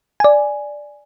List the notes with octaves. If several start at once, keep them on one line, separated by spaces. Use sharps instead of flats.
D5 G#5